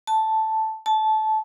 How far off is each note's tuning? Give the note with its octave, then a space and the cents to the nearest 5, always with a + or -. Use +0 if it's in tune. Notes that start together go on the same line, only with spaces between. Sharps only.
A5 +0
A5 -20